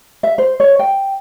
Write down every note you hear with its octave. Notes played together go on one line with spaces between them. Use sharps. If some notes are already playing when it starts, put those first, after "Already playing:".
E5
C5
C#5
G5